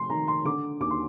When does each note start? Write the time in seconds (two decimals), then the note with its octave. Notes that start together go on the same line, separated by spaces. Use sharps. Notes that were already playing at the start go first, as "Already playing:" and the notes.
Already playing: F1 C6
0.10 D#3 A#5
0.28 C6
0.45 D3 D6
0.80 D#2 D6
0.90 C6